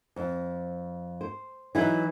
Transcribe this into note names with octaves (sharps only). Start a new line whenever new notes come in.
F2
C5
E3 F#3 D#4 E4 B4